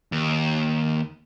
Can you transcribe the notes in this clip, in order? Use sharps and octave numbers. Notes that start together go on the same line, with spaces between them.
D#2